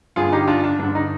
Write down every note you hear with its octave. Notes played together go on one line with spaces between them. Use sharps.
G2 D3 F4 G#4
D#4 G4
D4 F4
D4
G2 D3 D4
D#4